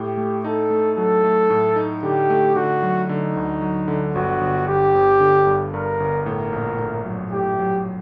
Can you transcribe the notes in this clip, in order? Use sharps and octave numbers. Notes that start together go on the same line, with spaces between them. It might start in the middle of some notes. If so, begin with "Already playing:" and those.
Already playing: A2 G4
A3
D#4 A4
A3
F#3 A4
A3
A2
D#4
D3 G4
A3
D3 F#4
F#3
D3 D#4
D2
F#3
D3
G1 F#4
G1
G1 G4
G1
D3
G2
G2 A#4
G1
A2 A#4
A#1
A2
F#3
A2 G4
F#3